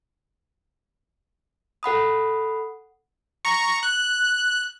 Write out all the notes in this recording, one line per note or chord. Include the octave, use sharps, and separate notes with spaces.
A4 F#5 B5 D#6
A#5 C#6
F#6